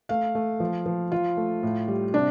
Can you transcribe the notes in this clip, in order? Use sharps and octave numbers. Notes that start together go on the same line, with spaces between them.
A3 F5
A3
F3
F3
F3 F4
A3
A2
G3
C3 D4